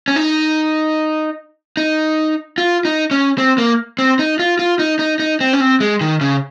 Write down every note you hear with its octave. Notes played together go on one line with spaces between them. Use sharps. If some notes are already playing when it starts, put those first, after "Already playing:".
C#4
D#4
D#4
F4
D#4
C#4
C4
A#3
C4
D#4
F4
F4
D#4
D#4
D#4
C4
C#4
C4
G#3
D#3
C#3